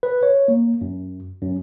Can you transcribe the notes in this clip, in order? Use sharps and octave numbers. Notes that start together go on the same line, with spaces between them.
B4
C#5
A#3
F#2
F#2